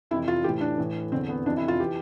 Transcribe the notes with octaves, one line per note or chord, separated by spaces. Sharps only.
F2 C3 E3 E4
F4
A2 E3 G4
D4
A2 E3
E2 D3 C4
B3
F2 C3 E3 D4
E4
F4
E3 G4